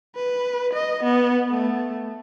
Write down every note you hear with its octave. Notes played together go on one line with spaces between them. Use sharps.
B4
D#5
B3
A3